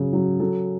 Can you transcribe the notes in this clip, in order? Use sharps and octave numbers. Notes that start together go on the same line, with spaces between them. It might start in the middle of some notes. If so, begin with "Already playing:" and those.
Already playing: C#3 F#3
F#3
F#3 A4